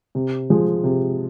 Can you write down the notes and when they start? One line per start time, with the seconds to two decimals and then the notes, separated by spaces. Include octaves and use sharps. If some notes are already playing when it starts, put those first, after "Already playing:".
0.15 C3
0.50 F3 G#3
0.84 C3